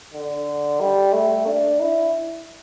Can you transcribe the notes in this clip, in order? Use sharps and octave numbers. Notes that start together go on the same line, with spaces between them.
D3
G3
A3
D4
E4